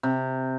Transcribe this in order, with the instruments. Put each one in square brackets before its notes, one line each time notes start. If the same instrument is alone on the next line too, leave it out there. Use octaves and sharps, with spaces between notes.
[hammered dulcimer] C3